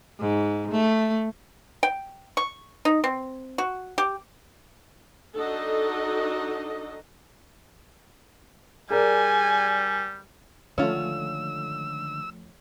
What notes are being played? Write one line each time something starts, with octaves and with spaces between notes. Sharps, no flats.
G#2
A3
G5
C#6
D#4
C4
F#4
G4
D4 D#4 F#4 A4 D#5
G3 G#4 A#4 D5 G#5
D3 D#3 F3 G#3 A3 C#4 F4 E6